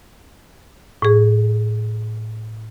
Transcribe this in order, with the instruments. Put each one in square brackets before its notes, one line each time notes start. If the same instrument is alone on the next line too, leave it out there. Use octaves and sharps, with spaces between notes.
[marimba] A2 G#4